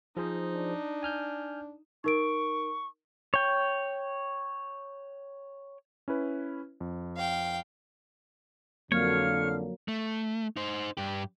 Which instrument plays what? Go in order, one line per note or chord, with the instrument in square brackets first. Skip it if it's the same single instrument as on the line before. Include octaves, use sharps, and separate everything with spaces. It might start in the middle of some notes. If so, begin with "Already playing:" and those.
[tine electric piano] F3 G#4 C5 [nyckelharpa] D#4
[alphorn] D4
[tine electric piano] G#5 F6 G6
[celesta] D#4 A#4 D7 [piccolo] C#6
[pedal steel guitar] C#5 G5
[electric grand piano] C#4 E4 B4
F2
[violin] F5 G5
[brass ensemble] F2 D3 [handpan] F3 F#3 A#3 [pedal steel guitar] C#5 [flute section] F5 F6
[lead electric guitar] A3
D#4 C5
G2 G4